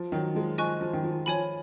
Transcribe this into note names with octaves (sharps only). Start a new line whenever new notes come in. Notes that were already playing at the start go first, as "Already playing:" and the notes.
Already playing: F3
D#3 F#3
F3 G#3
F3 D#5 G#5 C#6 F#6
F3
D#3
F3
F3 C#5 G#5 B5